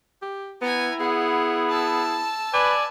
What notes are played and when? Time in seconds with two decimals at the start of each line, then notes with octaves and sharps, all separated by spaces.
0.22 G4
0.62 B3 E4 G#5 A#5
1.00 B3 G#4 F#5
1.69 A5 E6
2.54 B4 D5 G#5